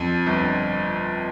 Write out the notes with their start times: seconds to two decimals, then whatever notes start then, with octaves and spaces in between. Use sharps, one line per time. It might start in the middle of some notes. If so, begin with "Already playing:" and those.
Already playing: F2
0.26 G1